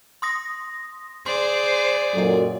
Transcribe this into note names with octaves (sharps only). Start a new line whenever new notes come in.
C6 D#6 A#6
G#4 C5 D5 C6
F#2 A#2 F#3 A4 D#5